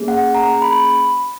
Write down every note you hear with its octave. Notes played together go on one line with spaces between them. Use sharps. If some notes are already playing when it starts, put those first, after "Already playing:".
Already playing: A#3 C#4 G#4
F#5
A#5
B5